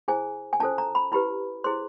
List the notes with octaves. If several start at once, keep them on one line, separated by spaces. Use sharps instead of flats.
E4 G#4 C5 G#5
G#5
C#4 F4 A4 C5 A5
A#5
B5
E4 G4 B4 B5
E4 G#4 C5 C6